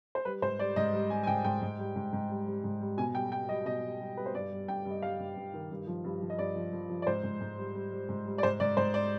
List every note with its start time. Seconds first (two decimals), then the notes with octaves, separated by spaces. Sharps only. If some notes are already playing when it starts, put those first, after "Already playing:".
0.15 C5
0.25 G3 B4
0.42 G#2 C5
0.59 G3 D5
0.76 G#2 D#5
0.93 G3
1.10 G3 G#5
1.23 G#5
1.27 G#2 G5
1.44 G#2 G5
1.61 G#2
1.79 G3
1.96 G#2
2.13 G#2
2.30 G3
2.47 G3
2.64 G#2
2.81 G3
2.97 B2 G#5
3.15 G3 G5
3.32 G3 G5
3.49 G3 D#5
3.66 B2 D#5
3.83 G3
4.00 G3
4.17 G3 B4
4.26 C5
4.34 G2 D5
4.51 G3
4.68 G2 G5
4.85 G2
4.91 D#5
5.02 G3 F5
5.19 G2
5.36 G2
5.54 D#3
5.71 G2
5.87 F3
6.04 G2
6.21 F3
6.30 D#5
6.38 G2 D5
6.56 F3
6.73 F3
6.89 F3
7.02 D5
7.06 G#2 C5
7.23 G#2
7.41 G#2
7.57 G3
7.75 G3
7.92 G3
8.09 G#2
8.26 G3
8.38 D5
8.43 G#2 C5
8.60 G#2 D5
8.77 G#2 C5
8.94 D5